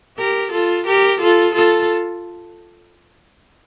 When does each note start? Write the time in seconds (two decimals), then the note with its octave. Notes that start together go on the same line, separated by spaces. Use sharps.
0.17 G4 A#4
0.52 F4 A4
0.86 G4 A#4
1.20 F4 A4
1.54 F4 A4